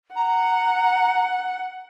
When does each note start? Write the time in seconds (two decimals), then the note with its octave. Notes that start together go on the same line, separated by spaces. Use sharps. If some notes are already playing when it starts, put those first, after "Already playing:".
0.16 F#5 A#5